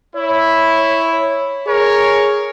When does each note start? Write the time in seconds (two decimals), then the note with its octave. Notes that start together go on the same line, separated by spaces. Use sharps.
0.16 E4 C#5
1.67 G#4 A#4 C#5